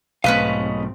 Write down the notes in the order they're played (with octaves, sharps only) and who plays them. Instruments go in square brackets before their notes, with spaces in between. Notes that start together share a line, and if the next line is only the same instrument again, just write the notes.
[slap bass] B1 A3 [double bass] G#2 C4 [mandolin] C#4 B4 D#5 [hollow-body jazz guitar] F5